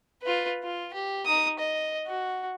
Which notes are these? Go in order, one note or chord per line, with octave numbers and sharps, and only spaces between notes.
F4 B4
F4
G4
D#4 D#6
D#5
F#4